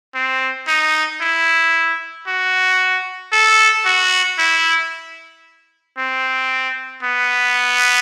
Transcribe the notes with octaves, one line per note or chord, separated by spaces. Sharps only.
C4
D#4
E4
F#4
A4
F#4
E4
C4
B3